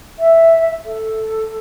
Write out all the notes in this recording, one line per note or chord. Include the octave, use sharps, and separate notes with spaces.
E5
A4